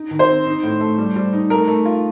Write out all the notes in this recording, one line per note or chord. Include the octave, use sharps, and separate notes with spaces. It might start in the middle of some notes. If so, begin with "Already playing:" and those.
Already playing: D#4
D#3
C5
C4
D#4
A2
A3
G3
G3
D#4
A3 A#4
A3
F4